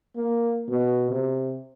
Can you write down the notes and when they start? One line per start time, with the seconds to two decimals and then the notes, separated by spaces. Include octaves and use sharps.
0.16 A#3
0.69 B2
1.10 C3